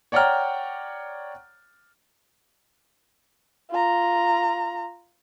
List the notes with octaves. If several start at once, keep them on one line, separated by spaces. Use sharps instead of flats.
C#5 D5 F#5 G5 A#5 F6
F4 A#5